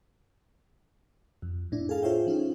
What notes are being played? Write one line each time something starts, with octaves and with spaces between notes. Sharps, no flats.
F2
A2 D4 E4
G#4 A4 F5 A5
F4 G#4 C5 C#5 E5 G5
F3 C#4 D#4 F4